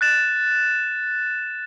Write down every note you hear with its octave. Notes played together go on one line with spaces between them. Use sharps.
F#6 A6 E7